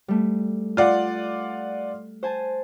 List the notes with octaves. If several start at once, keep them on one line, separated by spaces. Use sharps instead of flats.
G3 A3
F4 D5 F#5
C5 G#5 A5